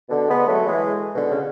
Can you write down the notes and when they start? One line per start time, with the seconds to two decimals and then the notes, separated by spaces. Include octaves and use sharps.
0.09 B2 D3
0.28 G#3 B3
0.47 F#3 A3
0.65 E3 G#3
1.15 B2 D3
1.31 C#3